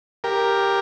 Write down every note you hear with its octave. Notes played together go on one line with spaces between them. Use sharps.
G4 A#4